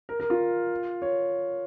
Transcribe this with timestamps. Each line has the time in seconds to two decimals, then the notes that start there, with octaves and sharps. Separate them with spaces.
0.09 A#4
0.20 A#4
0.30 F4
1.02 C#5